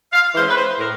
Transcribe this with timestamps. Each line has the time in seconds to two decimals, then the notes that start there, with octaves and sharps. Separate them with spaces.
0.13 F5
0.35 E3 G#3 C#4 C5
0.49 B4
0.57 C5
0.79 A2 A#4